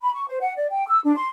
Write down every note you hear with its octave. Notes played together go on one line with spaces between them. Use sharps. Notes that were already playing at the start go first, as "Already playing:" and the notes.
B5
C#6
C5
F#5
D5
G5
E6
D4
C6